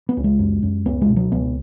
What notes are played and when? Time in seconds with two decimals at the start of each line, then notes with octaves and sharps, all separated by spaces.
0.09 B3
0.17 C#2
0.24 G#3
0.39 F#2
0.63 F#2
0.86 C#2 B3
1.02 G#3
1.09 B2
1.16 F#3
1.32 C#2 B3